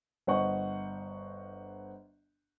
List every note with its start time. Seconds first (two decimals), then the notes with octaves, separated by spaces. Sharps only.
0.27 G1 C5 D#5 F#5 C#6